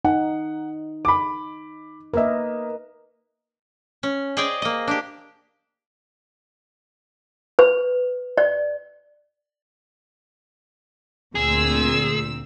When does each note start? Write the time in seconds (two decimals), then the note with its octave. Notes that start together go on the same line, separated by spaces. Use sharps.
0.05 D#4 F#5
1.05 B5 D6
2.14 A#3 A#4 B4 D#5 E5
4.03 C#4
4.37 G#4 C5 D5 D#5 G5 G#5
4.62 A#3 D#5
4.87 D4 G4
7.59 B4
8.38 D5
11.35 D2 A#2 C4 G#4 E6